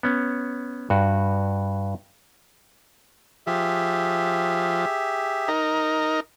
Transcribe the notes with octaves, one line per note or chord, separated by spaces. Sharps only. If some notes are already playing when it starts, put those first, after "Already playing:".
B3 C#4
G2 F#4
F3 G4 G#4 E5
D#4 A#4